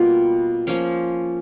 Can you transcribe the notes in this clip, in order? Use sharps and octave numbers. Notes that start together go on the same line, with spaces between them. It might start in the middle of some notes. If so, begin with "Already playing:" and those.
Already playing: B2 G3 A#3 F4
F3 A#3 C#4